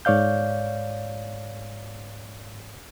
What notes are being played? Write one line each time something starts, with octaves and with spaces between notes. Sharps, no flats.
G#2 C#5 D5 F5 G6